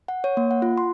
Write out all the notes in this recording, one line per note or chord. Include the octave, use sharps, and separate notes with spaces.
F#5
C#5
A#3
F#5
F4
C6